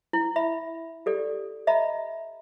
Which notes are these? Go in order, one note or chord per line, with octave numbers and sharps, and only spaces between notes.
E4
E5 B5
G4 A4 D5
D#5 E5 A#5 B5